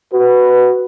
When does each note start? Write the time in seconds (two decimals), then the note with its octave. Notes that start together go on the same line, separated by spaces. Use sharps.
0.14 F#4 B4